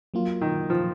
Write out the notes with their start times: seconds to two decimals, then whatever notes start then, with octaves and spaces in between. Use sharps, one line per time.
0.14 F#3 A#3 F4
0.41 D#3
0.70 F3